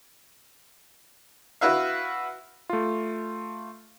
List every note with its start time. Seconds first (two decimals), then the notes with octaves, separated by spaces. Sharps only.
1.61 E4 F#4 B4 E5 F5
2.69 A3 F4